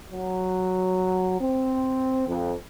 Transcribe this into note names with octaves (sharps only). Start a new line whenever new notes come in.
F#3
C4
F2